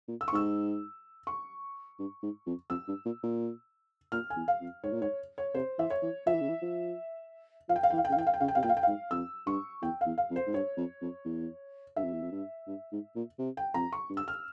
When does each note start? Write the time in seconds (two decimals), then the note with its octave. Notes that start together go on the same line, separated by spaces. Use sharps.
0.08 A#2
0.21 E6
0.28 C#6
0.33 G#2 E6
1.27 C#6
1.99 G2
2.23 G#2
2.46 F2
2.70 F2 E6
2.88 G2
3.05 A#2
3.23 A#2
4.12 A#2 F6
4.30 G#5
4.36 E2
4.48 F5
4.61 F2
4.83 G#2 C#5
4.93 A#2
5.01 G#2 C#5
5.38 C#5
5.55 C3 C5
5.79 E3 E5
5.90 C#5
6.02 E3
6.26 F3 E5
6.34 E3
6.41 C#3
6.49 E3
6.62 F3
7.69 F3 F5
7.76 G5
7.83 F5
7.90 E3 G5
7.98 F5
8.05 G5
8.10 C#3
8.12 F5
8.16 E3
8.18 G5
8.27 F5
8.34 G5
8.40 C#3 F5
8.48 G5
8.55 C3 F5
8.63 A#2 G5
8.69 F5
8.77 G5
8.83 G#2 F5
9.11 F2 E6
9.47 G2 C#6
9.82 E2 G5
10.01 E2 F5
10.18 F5
10.30 F2
10.36 C5
10.47 G#2
10.54 G2 C#5
10.77 F2
11.02 F2
11.25 E2
11.96 G2 E5
12.04 F2
12.13 E2
12.22 F2
12.32 G2
12.67 G2
12.92 G#2
13.16 A#2
13.39 C3
13.57 G5
13.74 F2 A#5
13.93 C#6
14.10 G2
14.17 E6
14.28 F6